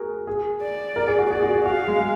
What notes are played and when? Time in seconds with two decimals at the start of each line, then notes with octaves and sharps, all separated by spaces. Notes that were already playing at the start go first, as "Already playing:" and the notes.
Already playing: F#4 G#4 A#4
0.27 G#4
0.61 D5
0.96 A#4
1.08 G#4
1.18 F#4
1.31 G#4 D5
1.42 F#4
1.53 G#4
1.64 F#4 F5
1.88 G#3
1.99 G#3